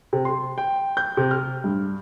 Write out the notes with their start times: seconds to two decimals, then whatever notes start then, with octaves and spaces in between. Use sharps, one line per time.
0.13 C3
0.25 C6
0.58 G5
0.97 G6
1.17 C3
1.31 F6
1.64 G2